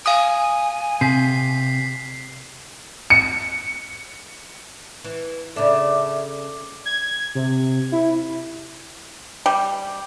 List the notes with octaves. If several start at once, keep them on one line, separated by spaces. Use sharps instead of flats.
F5 G#5 D#6
C3 B6 C7
C#7
E3
C#3 D4 A4 E5 D6
G#6
C3
E4
G3